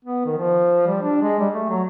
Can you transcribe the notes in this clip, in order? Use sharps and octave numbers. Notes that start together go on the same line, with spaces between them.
B3
D#3
F3
G3
D4
G#3
G3
A3
F#3